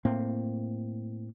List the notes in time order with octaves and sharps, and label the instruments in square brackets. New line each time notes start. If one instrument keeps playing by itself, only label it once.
[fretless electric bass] A2 A#3 C4